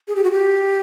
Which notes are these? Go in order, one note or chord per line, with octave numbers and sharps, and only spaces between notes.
G#4
G4
F#4
G4